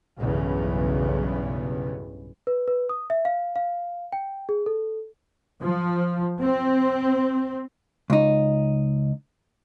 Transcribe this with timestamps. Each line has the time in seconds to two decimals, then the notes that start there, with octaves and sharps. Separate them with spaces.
0.20 B1 E2 G2 C#3 B3
2.47 B4
2.68 B4
2.89 D#6
3.10 E5
3.25 F5
3.56 F5
4.12 G5
4.49 G#4
4.66 A4
5.61 F3
6.41 C4
8.10 C#2 D#4